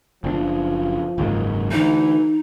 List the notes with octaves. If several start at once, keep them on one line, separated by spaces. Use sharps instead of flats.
F#1 F3 C4 D4
F#1 D#2 G#2
D2 E3 D#4